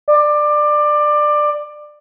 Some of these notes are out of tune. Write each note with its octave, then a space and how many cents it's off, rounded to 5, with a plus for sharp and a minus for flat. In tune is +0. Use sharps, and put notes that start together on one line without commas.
D5 +20